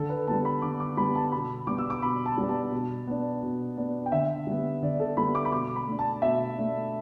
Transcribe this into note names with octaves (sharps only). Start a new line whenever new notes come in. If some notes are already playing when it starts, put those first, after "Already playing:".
Already playing: D3 A4
B4
G3 B3 A5
B5
D3 D6
D6
G3 B3 B5
A5
B2 B5
G3 B3 D4 D6
E6
D6
B2 B5
A5
G3 B3 D4
A5
B2
B3 D4
B2
B3 D4
G5
D3 E5
G3 B3
D3 D5
A4
G3 B3 B5
D6
B5
B2 D6
B5
A3 D4
A5
B2 E5
A3 D4